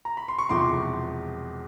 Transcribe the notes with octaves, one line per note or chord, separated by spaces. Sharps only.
A#5
B5
C6
C#6
E1 E2 C3 F3 C6 D6